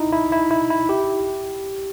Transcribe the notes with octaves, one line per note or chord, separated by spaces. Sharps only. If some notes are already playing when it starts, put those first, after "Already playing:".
Already playing: D#4 E4
E4
E4
E4
E4
G4